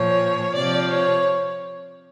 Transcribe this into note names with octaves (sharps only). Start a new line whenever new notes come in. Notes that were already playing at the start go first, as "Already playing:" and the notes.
Already playing: A#2 F3 C#5
C3 F3 D5
C#5